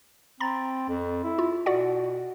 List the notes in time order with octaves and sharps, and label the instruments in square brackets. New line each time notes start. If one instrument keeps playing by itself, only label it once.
[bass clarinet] C4 [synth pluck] A#5 B5 A6
[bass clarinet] F2
E4
[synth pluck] F4
[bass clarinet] B2 [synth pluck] F#4 D5 F#5